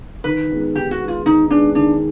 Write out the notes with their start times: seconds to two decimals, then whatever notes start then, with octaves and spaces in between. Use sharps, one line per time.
0.24 D#3 B4
0.50 G#3 B3
0.75 D#3 G4
0.91 F#4
1.00 G#3 B3
1.08 F4
1.25 D#3 D#4
1.51 G#3 B3 D4
1.75 D#3 D4